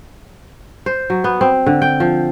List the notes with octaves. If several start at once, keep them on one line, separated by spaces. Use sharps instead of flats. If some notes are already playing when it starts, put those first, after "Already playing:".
C5
F#3
B3
C4
D3
G5
F3